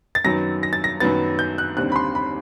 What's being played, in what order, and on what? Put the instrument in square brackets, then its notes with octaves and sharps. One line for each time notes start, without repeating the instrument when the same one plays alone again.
[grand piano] A6
F#2 D#3 F#3 B3 A#6
A#6
A6
A#6
F#2 D#3 F#3 B3 A6
G6
F#6
D#2 D3 G3 C4 F#6
B5
C6
B5